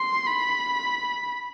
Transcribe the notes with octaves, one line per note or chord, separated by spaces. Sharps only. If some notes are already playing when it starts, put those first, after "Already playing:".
Already playing: C6
B5